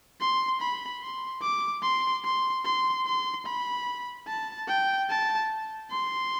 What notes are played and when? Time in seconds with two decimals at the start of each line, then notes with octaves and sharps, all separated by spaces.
0.21 C6
0.61 B5
1.01 C6
1.42 D6
1.83 C6
2.24 C6
2.65 C6
3.06 C6
3.46 B5
4.28 A5
4.68 G5
5.09 A5
5.90 C6